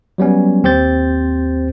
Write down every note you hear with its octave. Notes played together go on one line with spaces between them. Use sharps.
F#3 G3 B3 C#4
D#2 C4 G4 C5 G6 A6